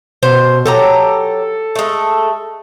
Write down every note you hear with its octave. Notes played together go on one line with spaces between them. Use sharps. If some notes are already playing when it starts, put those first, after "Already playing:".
B2 C5
F#3 G4 A4 A#5
G#3 A3